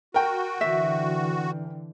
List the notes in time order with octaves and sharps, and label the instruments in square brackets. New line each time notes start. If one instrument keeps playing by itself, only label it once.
[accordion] F#4 [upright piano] A#4 G5
[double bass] D3 E3 [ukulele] E5